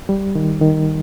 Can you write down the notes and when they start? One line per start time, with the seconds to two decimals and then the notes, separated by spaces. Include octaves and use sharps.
0.09 G3
0.35 D#3
0.61 D#3